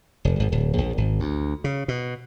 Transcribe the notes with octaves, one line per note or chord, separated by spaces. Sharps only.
F1
G#1
D1
A#1
G#1
D2
C#3
B2